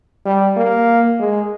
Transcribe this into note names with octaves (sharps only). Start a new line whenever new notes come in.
G3
A#3
G#3